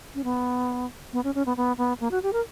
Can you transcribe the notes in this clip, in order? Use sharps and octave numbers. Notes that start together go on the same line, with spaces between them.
C#4
B3
B3
C#4
C#4
B3
B3
B3
A#3
F#4
G4
A#4